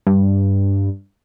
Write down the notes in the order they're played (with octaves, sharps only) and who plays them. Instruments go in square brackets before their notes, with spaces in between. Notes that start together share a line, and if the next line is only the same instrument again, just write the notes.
[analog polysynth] G2